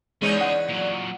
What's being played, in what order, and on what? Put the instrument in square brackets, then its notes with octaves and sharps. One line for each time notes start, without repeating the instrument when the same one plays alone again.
[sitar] E2 D#4 C#5 [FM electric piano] G#3 [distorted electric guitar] C#4 D#5
[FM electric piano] F#5
[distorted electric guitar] A#2 F#3